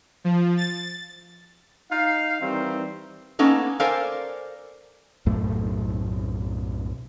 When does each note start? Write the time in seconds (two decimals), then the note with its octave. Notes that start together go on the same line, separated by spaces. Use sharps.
0.24 F3
0.57 A6
1.91 D#4 F5
2.42 D#3 E3 G3 C4
3.39 A#3 B3 C#4 D#4 A4
3.80 A4 A#4 C5 D5 F5 G#5
5.26 B1 F#2 A2 A3